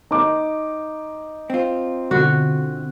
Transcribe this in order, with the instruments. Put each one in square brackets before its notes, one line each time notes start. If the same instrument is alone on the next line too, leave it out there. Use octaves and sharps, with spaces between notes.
[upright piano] D#4 D6
[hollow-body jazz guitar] C4 F4
[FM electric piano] B2 D3 [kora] F#4